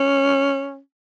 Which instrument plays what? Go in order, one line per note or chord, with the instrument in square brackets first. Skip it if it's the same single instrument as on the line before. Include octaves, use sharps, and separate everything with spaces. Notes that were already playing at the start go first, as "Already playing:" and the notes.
Already playing: [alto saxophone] C#4